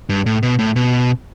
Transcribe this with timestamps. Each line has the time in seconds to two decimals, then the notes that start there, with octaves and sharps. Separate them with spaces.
0.09 G2
0.26 A2
0.43 B2
0.59 A2
0.76 B2